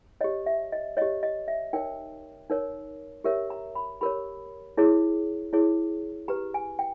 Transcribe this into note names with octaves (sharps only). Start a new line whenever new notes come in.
G4 C#5 D#5
E5
D#5
G4 C#5 D#5
D#5
E5
D#4 A#4 C#5 G5
D#4 A#4 C#5
G4 A#4 C#5 E5
A#5
B5
G4 A#4 C#5 B5
E4 G#4 C#5
E4 G#4 C#5
G4 B4 A#5
G#5
G5